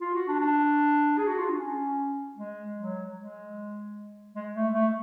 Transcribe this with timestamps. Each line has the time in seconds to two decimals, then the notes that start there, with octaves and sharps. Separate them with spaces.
0.01 F4
0.14 F#4
0.28 D4
0.40 D4
1.18 G#4
1.27 F#4
1.39 F4
1.49 D4
1.58 C#4
2.37 G#3
2.77 F#3
3.16 G#3
4.34 G#3
4.54 A3
4.74 A3